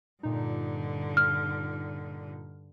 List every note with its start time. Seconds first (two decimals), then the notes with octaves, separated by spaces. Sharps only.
0.23 G2 A#2 D3 D#4
1.17 F6